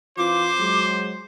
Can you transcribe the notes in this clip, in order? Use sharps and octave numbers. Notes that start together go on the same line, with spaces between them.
E3 C4 F4 C5 D6
F#3 G#3